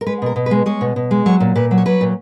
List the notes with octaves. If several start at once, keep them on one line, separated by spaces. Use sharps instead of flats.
A#4
G#3 B4
B2 A#4
B2
B4
G#3
G#3 C#5
B2
B2
G#3
F#3 C#5
A#2
A#2 B4
F#3
C#5
F#3 B4
A#2